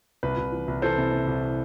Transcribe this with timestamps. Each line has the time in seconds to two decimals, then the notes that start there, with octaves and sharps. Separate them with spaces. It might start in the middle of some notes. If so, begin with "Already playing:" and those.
0.23 C2 B4
0.37 C2
0.52 E3
0.68 C2
0.82 E3 A4 C5
0.98 C3
1.12 C3
1.27 C2